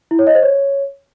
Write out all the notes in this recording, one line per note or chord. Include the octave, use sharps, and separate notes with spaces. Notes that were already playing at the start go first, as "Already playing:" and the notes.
E4
C#5
D#5
C5
C#5